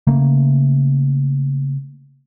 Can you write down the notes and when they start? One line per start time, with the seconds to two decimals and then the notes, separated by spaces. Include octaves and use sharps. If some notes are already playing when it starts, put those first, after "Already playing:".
0.07 C#3 A3 A#3